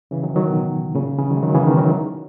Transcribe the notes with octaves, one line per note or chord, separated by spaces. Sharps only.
C#3 E3
D#3 F#3
D#3 F#3
B2
A#2 C#3
C#3 E3
D#3 F#3
G#3
D#3 F#3
C#3 E3
B2 D#3
D#3 F#3